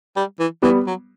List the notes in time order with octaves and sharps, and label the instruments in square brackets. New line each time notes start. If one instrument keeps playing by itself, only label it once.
[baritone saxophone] G3
E3
[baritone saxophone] E3 [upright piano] G3 B3
[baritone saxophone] F#3